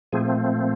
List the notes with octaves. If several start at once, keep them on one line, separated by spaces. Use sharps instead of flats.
A#2 F3 A3 C4 G#4